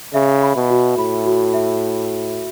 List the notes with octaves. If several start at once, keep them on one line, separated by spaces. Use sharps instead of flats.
C#3 E5
B5
B2
F#4
A2 B5
F#4
E5